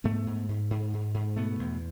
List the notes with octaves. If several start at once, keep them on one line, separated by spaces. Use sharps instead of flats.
G#2 A3 B3
G#2
G#2
G#2
G#2
G#2
B2 A3 B3
E2